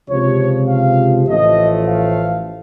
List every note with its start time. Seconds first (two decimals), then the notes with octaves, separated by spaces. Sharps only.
0.09 C#2 C3 F3 C#5
0.68 F5
1.27 A1 A2 F3 A3 D#5
1.87 F5